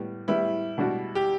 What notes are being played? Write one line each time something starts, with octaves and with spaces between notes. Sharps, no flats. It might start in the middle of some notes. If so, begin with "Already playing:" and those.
Already playing: A2 G3 B3
A2 G3 B3 E4
B2 G3 D4 F#4
G4